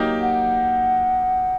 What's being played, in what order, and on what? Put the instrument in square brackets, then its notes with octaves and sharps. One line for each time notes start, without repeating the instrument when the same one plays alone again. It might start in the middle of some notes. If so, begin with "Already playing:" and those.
Already playing: [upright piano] F#3 A#3 D#4 G4
[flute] F#5